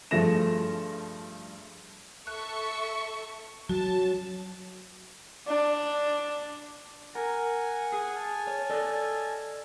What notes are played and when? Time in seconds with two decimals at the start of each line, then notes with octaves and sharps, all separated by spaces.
0.11 G2 F3 A3 G#4 A#6 E7
2.27 A4 E5 C#6 F#6
3.69 F#3 F#4 A5
5.47 D4
7.15 A#4 F#5 G#5
7.92 G#4
8.16 G#5 A5 F6
8.47 C#5
8.70 A4 D5 D#5